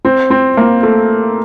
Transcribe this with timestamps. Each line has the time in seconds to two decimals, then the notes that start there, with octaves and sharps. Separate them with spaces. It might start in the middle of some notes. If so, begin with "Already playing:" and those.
0.05 C4
0.30 C4
0.57 A#3
0.83 A3